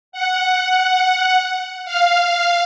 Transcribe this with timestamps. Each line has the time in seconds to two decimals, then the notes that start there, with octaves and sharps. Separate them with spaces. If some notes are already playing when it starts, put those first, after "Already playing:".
0.12 F#5
1.85 F5